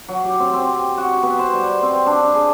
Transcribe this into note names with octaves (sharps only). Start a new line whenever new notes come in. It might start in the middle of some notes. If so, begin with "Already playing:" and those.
F#3
G4
C4
C4
F#4
B3
C5
G3
C4
D4
G#4